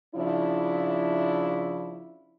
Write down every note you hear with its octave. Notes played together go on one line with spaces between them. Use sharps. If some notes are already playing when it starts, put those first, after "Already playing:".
C#3 F3 D4 E4